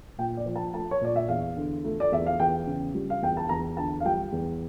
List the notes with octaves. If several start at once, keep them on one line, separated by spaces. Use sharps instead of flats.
A#2 G5
D5
F3
A5
A3 A5
C#5
A#2 D5
E5
E2 F5
D3
A3
D5
E2 E5
F5
E2 G5
C#3
G3
F5
E2 G5
A5
E2 A#5
D3 A5
F5
G3 G5
E2